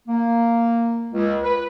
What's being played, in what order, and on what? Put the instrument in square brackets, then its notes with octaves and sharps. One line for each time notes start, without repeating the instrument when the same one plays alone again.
[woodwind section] A#3
C#2
B4